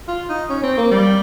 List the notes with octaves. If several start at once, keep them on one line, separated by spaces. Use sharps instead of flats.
F4
D#4
C#4
C4
A#3
G3